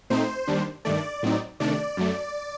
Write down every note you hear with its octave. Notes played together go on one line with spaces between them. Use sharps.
A#2 A3 C4 D#4 C5
D#2 D#3 G3 D4
G2 D#3 A3 D5
A2 F#3 C4 D#4
C3 D#3 A3 D4 D5
F#2 F#3 A3